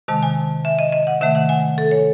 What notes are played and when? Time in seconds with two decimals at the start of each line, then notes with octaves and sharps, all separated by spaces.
0.08 C3 D#3 G#3 A5
0.23 G#5
0.65 E5
0.79 D#5
0.93 D#5
1.07 F#5
1.21 C3 D#3 A3 E5
1.35 F#5
1.49 G#5
1.78 A4
1.91 C#5